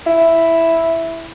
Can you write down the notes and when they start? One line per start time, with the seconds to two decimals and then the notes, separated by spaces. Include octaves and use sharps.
0.07 E4